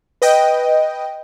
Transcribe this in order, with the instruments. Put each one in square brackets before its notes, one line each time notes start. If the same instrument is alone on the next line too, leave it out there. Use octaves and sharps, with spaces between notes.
[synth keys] B4 D#5 G5